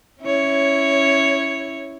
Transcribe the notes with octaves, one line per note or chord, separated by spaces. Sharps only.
C#4 E4 C#5